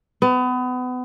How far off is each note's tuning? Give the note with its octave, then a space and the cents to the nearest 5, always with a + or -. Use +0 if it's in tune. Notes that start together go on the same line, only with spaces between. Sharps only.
B3 +30